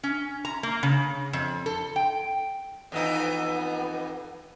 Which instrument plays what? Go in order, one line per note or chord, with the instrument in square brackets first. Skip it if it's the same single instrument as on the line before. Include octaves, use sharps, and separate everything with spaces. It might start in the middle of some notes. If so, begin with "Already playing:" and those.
[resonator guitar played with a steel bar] C#4
A#5
A#3
C#3
F2
A4
G5
[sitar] F2 E3 D#4 [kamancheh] B3